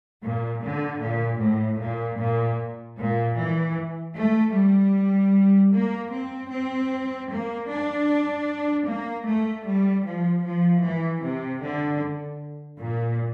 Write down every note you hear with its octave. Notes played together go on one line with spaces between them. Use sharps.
A#2
D3
A#2
A2
A#2
A#2
A#2
E3
A3
G3
A#3
C4
C4
A#3
D4
A#3
A3
G3
F3
F3
E3
C3
D3
A#2